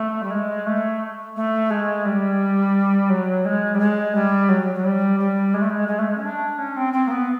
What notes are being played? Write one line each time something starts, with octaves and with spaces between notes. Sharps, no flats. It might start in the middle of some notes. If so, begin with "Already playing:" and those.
Already playing: A3
G3
G#3
A3
A3
G#3
G3
F#3
G#3
G3
G#3
G3
F#3
F#3
G3
G3
G#3
A3
G#3
G#3
A3
G#3
C#4
D4
C#4
C4
C4
A#3
B3